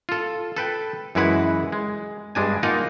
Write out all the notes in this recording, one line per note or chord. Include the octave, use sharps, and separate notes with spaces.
F4 A4
A4 B4 G5
F#2 E3 G#3 E4 B4 F#5
G#3
G2 G#3 D4 G#5
A#3 D#4 F4 D#5 F5 F#5